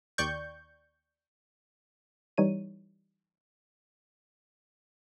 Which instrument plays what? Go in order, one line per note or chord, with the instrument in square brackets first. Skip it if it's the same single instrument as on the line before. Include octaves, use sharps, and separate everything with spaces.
[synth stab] D#2 D5 G5 C#6 G6
[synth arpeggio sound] E3 G3 D#4 C#5 D#7